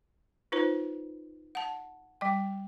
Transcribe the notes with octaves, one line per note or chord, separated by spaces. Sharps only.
D#4 F4 B4 C5
F#5 A5
G3 G5